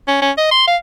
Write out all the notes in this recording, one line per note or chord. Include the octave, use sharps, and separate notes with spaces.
C#4
C#4
D#5
C6
F5